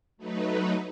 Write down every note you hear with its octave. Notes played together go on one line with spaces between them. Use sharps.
F#3 A3 D#4 B4